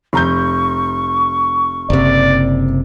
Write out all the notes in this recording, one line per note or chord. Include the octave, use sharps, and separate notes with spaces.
F1 A#5 C#6 G6
F#1 C3 D5